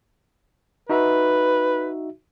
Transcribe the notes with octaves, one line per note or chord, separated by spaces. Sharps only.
D#4 F#4 B4 E5